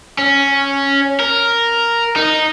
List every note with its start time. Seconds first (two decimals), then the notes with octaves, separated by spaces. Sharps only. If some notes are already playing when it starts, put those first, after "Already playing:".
0.18 C#4
1.20 A#4
2.16 D#4